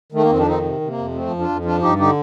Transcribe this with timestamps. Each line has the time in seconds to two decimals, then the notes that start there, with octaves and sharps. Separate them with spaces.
0.12 D#3 A3
0.23 A#3
0.29 F2 C4
0.39 D4
0.47 D#3 C4 D#4
0.64 C3
0.81 C3
0.88 A#3
0.97 F2
1.14 F3 A3 C4
1.31 F2
1.39 D4 F4
1.49 F2
1.65 F3 D4 F4
1.82 G2 D#4 G4
1.99 D3 D#4 G4